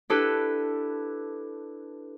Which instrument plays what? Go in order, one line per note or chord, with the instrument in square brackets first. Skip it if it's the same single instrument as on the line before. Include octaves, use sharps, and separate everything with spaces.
[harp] D4 E4 G4 A4 B4